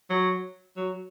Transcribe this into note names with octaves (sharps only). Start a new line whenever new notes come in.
F#3
F#3